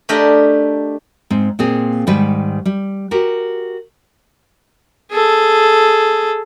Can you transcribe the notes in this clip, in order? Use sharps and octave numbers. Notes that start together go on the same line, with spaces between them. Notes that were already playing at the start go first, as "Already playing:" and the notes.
A3 D4 G4 A#4 D#5
G#2 C4
A#2 A#3 C4 G#4
G#2 D#3 G3 B4
G3
F#4 G4 A#4
G#4 A4